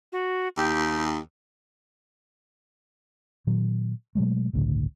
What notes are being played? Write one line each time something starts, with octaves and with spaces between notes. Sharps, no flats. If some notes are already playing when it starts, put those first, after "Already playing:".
F#4
D#2 G4
A#2 D#3 F#3
B2 F#3 G#3 A3
G1 C#2 A2 D3